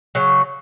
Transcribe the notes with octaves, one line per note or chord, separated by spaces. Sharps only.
C#3 F#3